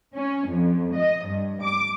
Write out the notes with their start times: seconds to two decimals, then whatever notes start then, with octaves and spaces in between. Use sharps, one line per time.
0.15 C#4
0.48 F2
0.96 D#5
1.27 G2
1.62 D6